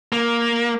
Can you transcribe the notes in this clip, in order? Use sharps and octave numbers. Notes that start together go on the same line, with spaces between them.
A#3